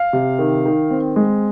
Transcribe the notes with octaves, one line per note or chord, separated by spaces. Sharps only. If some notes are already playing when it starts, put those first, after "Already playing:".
Already playing: F5
C3
D#3
D#3
C4
G#3